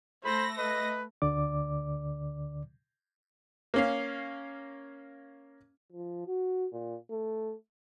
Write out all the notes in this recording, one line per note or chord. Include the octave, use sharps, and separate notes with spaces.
A3 C5 B5 A#6
B4 D#5
D2 D3 D5 D6
A#3 C#4 F5
F3
F#4
A#2
A3